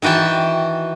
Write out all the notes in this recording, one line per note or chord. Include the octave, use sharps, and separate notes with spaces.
D#3 E3 F#4 G5 A5